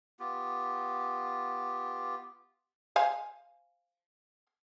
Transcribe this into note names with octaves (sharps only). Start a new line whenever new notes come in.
B3 F4 G4
C5 F5 G#5